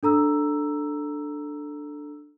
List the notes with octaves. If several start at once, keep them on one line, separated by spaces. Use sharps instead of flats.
D4 A4 A#5 E6